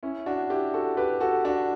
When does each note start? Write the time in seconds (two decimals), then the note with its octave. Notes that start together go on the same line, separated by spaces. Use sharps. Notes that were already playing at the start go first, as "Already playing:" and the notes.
0.03 C#4 E4
0.26 D4 F#4
0.50 E4 G4
0.74 F#4 A4
0.97 G4 B4
1.21 F#4 A4
1.45 D4 F#4